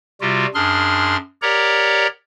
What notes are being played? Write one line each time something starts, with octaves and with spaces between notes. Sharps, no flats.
C3 G3 F4 F#4
F#2 D4 G#4 C6 F6
G4 A#4 C#5 D5 F#5 A#5